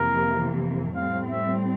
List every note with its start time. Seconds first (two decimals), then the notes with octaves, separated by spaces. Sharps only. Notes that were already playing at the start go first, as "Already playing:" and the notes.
Already playing: F2 C3 E3 A#3 A#4
0.96 A2 G3 C4 F5
1.30 E5